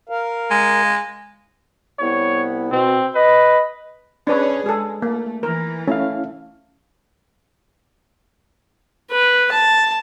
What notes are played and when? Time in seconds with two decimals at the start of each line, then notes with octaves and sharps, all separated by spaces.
0.09 A#4 F5
0.51 G#3
1.99 C2 B3 E4 C#5
2.72 B2 C4
3.15 B4 D#5
4.27 C#4 D4 G#4 B4 C#5
4.66 G#3 G#4 A4
5.02 A3 A#3
5.43 E3 A#4
5.88 A3 C#4 E4 F5
9.11 B4
9.52 A5